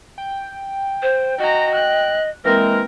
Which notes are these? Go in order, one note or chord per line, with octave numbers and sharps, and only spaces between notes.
G5
C5
F#4 D#5 A#5
F#6
E3 G#3 A#3 C4 A#4